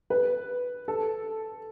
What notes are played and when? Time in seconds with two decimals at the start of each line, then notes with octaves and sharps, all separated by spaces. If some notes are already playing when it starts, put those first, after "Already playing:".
0.10 B4
0.88 A4